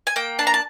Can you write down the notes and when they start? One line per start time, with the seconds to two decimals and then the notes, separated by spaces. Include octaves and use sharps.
0.07 G#5
0.16 A#3 G5
0.39 D4 A5
0.47 A#5
0.54 A5